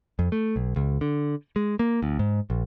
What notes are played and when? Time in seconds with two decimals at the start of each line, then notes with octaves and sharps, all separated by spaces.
0.19 F2
0.32 A3
0.56 B1
0.76 C#2
1.01 D3
1.56 G#3
1.79 A#3
2.03 D2
2.19 G#2
2.50 A#1